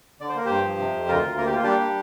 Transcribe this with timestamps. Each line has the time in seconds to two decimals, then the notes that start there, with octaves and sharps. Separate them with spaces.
0.20 D3 D5
0.29 C5
0.35 A#3 A#4
0.46 G2 G4 C5
0.64 F3
0.79 C3
0.94 F2
1.08 D2 F4 A#4
1.23 D2
1.37 A#3 A#4
1.46 G4
1.52 A#3 F4
1.64 G3 D4 G4
1.81 G3